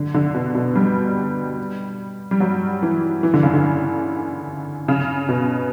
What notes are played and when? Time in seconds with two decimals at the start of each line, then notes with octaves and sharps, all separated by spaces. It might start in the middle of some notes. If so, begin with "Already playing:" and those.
Already playing: D3
0.14 D3
0.34 B2
0.55 B2
0.76 G3
2.31 G3
2.40 F#3
2.83 E3
3.23 E3
3.34 D3
3.43 C#3
3.53 D3
4.88 C#3
5.29 B2